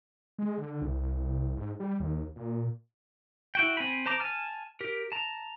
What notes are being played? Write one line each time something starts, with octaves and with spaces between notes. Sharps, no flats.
G#3
D3
C2
G#2
G3
D#2
A#2
E4 F#4 G5
C4 G#5 B5
C5 A5 A#5 D6
G#5 A5 F6
G4 A#4
A5 A#5